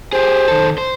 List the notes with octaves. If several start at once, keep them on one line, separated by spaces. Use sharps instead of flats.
G4 G#4 C5
D#3 A4
C5